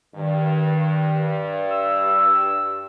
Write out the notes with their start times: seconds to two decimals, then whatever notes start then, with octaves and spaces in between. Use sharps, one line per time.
0.15 G2 D#3
1.71 E6